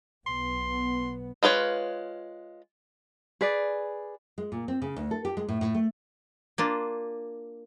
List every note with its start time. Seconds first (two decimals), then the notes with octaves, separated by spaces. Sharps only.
0.26 B1 B3 C6
1.43 G#3 F4 B4 C#5
3.41 G#4 B4 D5
4.38 G#3
4.52 A#2
4.68 C4
4.82 C#3
4.96 D2
5.11 A4
5.25 G4
5.37 G#3
5.48 A2
5.61 A2
5.75 A3
6.58 A#3 D4 F4